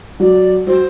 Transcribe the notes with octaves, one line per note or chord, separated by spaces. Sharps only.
F#3 F#4 D5
F#3 F#4 C5